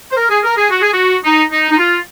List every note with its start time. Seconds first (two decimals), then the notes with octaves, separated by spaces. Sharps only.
0.11 C5
0.16 A#4
0.29 G#4
0.43 A#4
0.57 G#4
0.70 F#4
0.82 G#4
0.93 F#4
1.24 D#4
1.51 D#4
1.70 D#4
1.77 F4